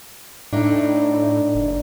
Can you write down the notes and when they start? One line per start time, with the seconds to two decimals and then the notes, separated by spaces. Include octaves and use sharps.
0.53 A2 D4 D#4
1.55 F#1